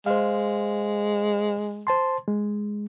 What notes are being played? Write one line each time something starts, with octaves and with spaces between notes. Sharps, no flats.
G#3 C5 F5
C5 A5 C6
G#3